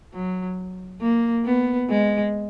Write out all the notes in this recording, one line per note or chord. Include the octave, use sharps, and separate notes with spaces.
F#3
A#3
B3
G#3